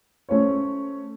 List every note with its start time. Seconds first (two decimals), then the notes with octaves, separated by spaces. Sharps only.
0.29 A3 C#4 C5 C#5